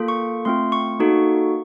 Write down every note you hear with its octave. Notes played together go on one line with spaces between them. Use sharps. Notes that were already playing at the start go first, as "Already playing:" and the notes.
Already playing: A#3 F4 A4
C#6
A3 C4 F4 C6
C#6
A#3 D#4 F#4 A4